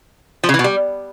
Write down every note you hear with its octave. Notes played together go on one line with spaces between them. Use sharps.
F3
C#3
E3
B2
G3